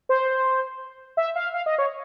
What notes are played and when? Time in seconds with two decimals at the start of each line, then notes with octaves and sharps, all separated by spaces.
0.09 C5
1.17 E5
1.36 F5
1.54 F5
1.66 D#5
1.78 C#5